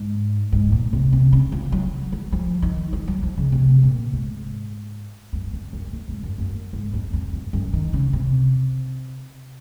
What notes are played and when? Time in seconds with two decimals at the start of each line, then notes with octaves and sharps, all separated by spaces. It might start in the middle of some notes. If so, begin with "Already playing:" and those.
Already playing: G#2
0.52 G#2
0.72 A#2
0.93 C3
1.13 C3
1.32 C#3
1.52 F3
1.72 F#3
2.12 F#3
2.32 F3
2.62 D#3
2.93 F3
3.08 F#3
3.23 F3
3.37 C#3
3.52 C3
3.83 A#2
4.13 G#2
5.33 F#2
5.53 F2
5.73 F#2
5.93 F2
6.08 G#2
6.23 F#2
6.38 F#2
6.73 G#2
6.94 F2
7.13 F2
7.33 F#2
7.53 F#2
7.73 D#3
7.93 C#3
8.13 C3